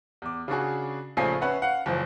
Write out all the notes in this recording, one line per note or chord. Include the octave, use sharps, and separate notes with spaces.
E2 D6
C#3 D4 F#4 G#4
A#1 C#3 F3 A3 G#5 C7
C#4 B4 E5 F#5
F5 F#5
F#1 E3 F3